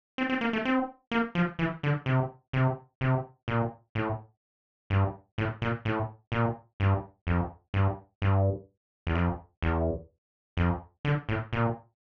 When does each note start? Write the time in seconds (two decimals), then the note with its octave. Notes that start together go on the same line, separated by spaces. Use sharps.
0.18 C4
0.29 C4
0.41 A#3
0.53 A3
0.65 C4
1.11 A#3
1.35 F3
1.59 E3
1.83 D3
2.06 C3
2.53 C3
3.01 C3
3.48 A#2
3.95 A2
4.90 G2
5.38 A2
5.62 A#2
5.85 A2
6.32 A#2
6.80 G2
7.27 F2
7.74 G2
8.22 G2
9.07 E2
9.15 F2
9.62 E2
10.57 F2
11.05 D3
11.29 A2
11.53 A#2